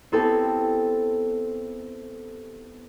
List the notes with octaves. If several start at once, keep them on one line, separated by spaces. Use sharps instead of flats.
B3 C4 E4 G4 A4